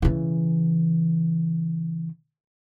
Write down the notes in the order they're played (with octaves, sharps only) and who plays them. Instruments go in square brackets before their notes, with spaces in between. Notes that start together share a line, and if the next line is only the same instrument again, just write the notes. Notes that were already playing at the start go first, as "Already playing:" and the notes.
[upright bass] C#3 E3